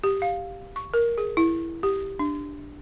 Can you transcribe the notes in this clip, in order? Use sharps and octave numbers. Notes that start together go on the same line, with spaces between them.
G4
F5
C#6
A#4
G#4
E4
G4
D4